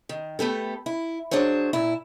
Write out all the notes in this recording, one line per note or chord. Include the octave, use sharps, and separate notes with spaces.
D#3
A3 B3 G4 A4
E4
F#3 D4 G#4 C5 C#5
A#2 E4